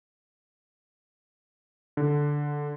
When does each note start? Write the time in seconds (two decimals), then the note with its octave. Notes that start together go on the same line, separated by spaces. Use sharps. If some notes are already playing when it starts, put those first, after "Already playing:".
1.97 D3